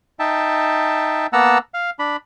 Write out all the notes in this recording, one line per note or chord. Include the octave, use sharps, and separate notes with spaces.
D#4 E5 G5 A5
A#3 B3 F#5 A5 A#5 E6
F5
D4 B5